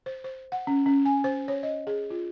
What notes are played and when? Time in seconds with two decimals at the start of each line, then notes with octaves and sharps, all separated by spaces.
0.06 C5
0.24 C5
0.52 F#5
0.67 C#4
0.86 C#4
1.05 G#5
1.24 C5
1.48 C#5
1.63 D#5
1.87 G#4
2.10 F4